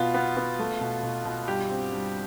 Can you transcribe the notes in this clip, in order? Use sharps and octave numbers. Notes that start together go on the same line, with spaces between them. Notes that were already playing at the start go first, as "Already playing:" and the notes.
Already playing: B2 B3 F4
B3
B3
A3
B2
B2
B2
G2 G4
C4
G2